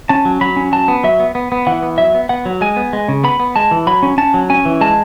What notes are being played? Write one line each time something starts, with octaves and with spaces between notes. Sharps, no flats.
C#4 A5
F#3
F#3 B5
C#4
F#3 A5
B3
F#3 E5
B3
B3
B3
E3 F#5
B3
F#3 E5
B3
B3 F#5
F#3
G#3 G#5
B3
G#3
C#3
B3 B5
B3
G#3 A5
E3
F#3 B5
C#4
C#4 A5
F#3
C#4 G#5
E3
G#3 A5